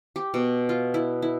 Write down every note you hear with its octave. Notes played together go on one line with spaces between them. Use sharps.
G4
B2
F4
E4
E4